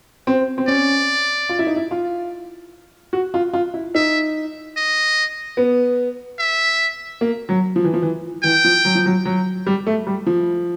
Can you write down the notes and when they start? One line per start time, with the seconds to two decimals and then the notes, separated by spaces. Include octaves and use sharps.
0.27 C4
0.58 C4
0.68 C#4 D5
1.49 F4
1.59 E4
1.67 D#4
1.76 E4
1.91 F4
3.13 F#4
3.34 F4
3.54 F4
3.74 E4
3.95 D#4 E5
4.77 D#5
5.57 B3
6.39 E5
7.21 A#3
7.49 F#3
7.76 F3
7.84 E3
7.94 F3
8.02 E3
8.43 E3 G5
8.64 F3
8.85 F#3
8.95 F3
9.06 F#3
9.25 F#3
9.66 G3
9.87 A3
10.07 G3
10.26 F3